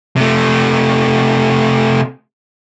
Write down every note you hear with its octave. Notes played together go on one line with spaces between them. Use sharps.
C3 A3